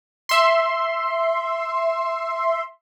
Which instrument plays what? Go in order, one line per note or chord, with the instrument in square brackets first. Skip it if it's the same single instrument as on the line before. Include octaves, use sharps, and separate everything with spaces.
[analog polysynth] E5 C6